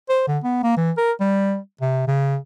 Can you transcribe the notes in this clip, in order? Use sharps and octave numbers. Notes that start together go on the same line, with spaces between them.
C5
D3
B3
A#3
E3
A#4
G3
C3
C#3